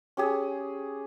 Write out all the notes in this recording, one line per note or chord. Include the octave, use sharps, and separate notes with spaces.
C#4 G4 G#4